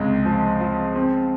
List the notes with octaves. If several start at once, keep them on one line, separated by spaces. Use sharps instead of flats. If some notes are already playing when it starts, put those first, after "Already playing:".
Already playing: C#2 C3 G#3
F3
F3
C4